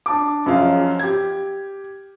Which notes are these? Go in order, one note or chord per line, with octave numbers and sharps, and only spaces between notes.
D4 A5 D6
F#2 F3 C#4 G#4 D#5 F5
G4 G#6